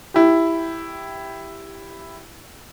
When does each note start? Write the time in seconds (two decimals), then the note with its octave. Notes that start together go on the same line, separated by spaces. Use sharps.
0.14 E4 G4